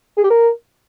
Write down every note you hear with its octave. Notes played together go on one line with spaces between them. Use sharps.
G#4
G4
A#4